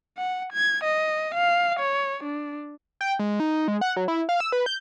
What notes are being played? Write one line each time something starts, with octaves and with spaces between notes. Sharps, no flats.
F#5
G#6
D#5
F5
C#5
D4
G5
G#3
D#4
G#3
F#5
F#3
E4
F5
E6
B4
G6